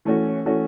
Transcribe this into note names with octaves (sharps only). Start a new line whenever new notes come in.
E3 A3 C#4 F#4
E3 A3 C#4 F#4